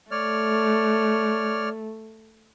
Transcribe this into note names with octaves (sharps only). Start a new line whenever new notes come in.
A3 C#5 D5 F6